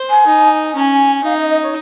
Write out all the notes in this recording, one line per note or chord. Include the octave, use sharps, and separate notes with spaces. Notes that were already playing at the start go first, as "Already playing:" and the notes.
Already playing: C5
G#5
D#4
C#4 G#5 A#5
D#4 F5
D#5
D#5
C#5